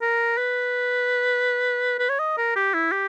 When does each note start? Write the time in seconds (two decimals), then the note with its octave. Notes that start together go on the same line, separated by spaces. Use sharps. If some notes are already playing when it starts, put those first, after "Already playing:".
0.02 A#4
0.37 B4
1.99 B4
2.09 C#5
2.19 D#5
2.38 A#4
2.56 G4
2.74 E4
2.92 G4